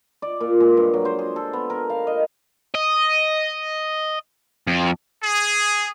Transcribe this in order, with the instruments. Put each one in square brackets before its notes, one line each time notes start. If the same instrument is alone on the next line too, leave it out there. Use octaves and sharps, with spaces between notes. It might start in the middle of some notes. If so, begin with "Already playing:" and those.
[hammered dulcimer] D5
A#2
G#3
G2
F#3
C5
G#4
A4
B3
A#4
F5
D#5
[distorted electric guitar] D#5
F2
[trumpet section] G#4